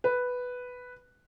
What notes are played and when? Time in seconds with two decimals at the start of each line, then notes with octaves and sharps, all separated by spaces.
0.04 B4